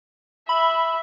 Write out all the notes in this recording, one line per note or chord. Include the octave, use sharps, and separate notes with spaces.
E5 B5